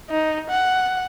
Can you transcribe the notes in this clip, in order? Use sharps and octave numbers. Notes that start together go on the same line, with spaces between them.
D#4
F#5